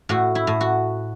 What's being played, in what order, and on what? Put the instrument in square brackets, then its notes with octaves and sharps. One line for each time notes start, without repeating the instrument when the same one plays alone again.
[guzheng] A2 F#4
E4
A2
F#4